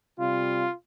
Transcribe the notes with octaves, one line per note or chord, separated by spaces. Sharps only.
C3 G3 F4